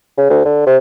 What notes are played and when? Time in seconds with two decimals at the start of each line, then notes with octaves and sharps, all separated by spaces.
0.17 C#3
0.30 D2
0.45 D3
0.66 C3